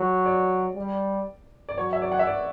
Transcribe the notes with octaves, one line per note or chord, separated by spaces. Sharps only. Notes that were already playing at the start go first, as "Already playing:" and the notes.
Already playing: F#3
D5
G3
D5
F#3 C#5
E5
D5
F#5
E5
D5